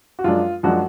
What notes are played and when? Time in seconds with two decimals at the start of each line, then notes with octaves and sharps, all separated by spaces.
0.19 F#4
0.24 F#2 F3 G#3 D4 F4
0.63 F#2 F3 G#3 D4 F#4